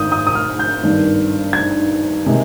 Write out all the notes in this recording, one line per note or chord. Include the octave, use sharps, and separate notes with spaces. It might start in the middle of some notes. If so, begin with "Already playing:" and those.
Already playing: G#1 G#2 D#3 D#6 G6
D#6
D#6
F6
G6
G#1 G2 D#3
G#6
C3 D#3 G#3